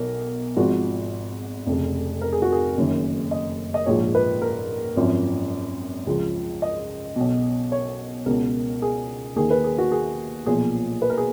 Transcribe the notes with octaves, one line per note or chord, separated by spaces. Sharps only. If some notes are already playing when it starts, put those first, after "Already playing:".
Already playing: B1 B2 A#4
G#1 G#2 F3 F#4
F1 F2 C#3
A#4
G#4
F#4
G#4
F#1 F#2 D#3
D#5
D#5
A#1 G#2 F3 C#5
B4
A#4
G#1 F#2 F3
C#2 C#3 F3
D#5
B1 B2
C#5
C#2 B2 A#4
G#4
D#2 D#3 G#4
B4
G#4
F#4
G#4
B1 A#2 F3 G#4
B4
A#4
G#4